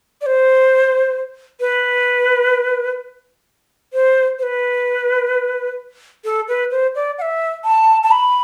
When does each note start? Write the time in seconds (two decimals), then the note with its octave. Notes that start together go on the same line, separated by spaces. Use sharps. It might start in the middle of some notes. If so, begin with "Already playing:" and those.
0.21 D5
0.26 C5
1.60 B4
3.93 C5
4.39 C5
4.43 B4
6.25 A4
6.48 B4
6.71 C5
6.95 D5
7.18 F#5
7.22 E5
7.64 A5
8.03 A5
8.11 B5